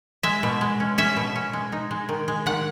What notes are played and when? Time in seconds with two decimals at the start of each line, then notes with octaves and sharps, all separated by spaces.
0.23 G#3 E5
0.43 B2
0.61 G#3
0.80 C#4
0.98 C#4 E5
1.17 B2
1.36 C#4
1.53 G#3
1.72 D#4
1.91 G#3
2.09 D#3
2.28 G#3
2.46 D#3 F#5